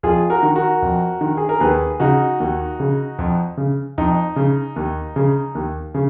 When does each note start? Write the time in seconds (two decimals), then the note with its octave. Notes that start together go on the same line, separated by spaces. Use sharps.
0.03 F2 F4 G#4
0.30 F#4 A#4
0.43 D#3
0.56 F#4 A#4
0.82 F2
1.21 D#3
1.37 G#4
1.49 A#4
1.60 D#2 G#4 B4
2.00 C#3 D#4 F#4
2.40 D#2
2.80 C#3
3.19 F2
3.57 C#3
3.98 F2 D#4
4.36 C#3
4.76 D#2
5.16 C#3
5.55 D#2
5.94 C#3